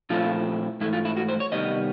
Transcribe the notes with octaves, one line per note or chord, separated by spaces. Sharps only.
A#2 F3 A3 C4 E4 F4
G#2 E3 A3 E4
F4
E4
F#4
C5
C#5
C3 D#3 G3 B3 D#5